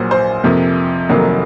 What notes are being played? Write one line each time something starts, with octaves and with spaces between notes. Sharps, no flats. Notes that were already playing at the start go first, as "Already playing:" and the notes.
Already playing: A#1 A#2 F#3 C5
C5
F2 C3 F3 A#3
F1 F2 D#3 F#3 A#3